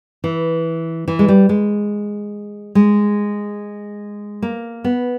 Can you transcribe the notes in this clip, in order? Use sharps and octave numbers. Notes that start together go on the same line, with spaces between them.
E3
E3
G#3
G3
G#3
G#3
A#3
B3